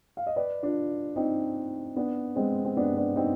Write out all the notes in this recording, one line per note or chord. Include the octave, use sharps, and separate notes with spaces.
F5
D#5
B4 D5
D4 F4
C4 D#4
B3 D4
G#3 C4
C4
B3 D4
B3 D4
C4 D#4